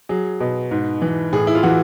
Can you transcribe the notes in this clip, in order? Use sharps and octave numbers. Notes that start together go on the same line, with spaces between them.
F#3 G#4
B2
G#2
E3
A2 G#4
E4
F4
E3 F#4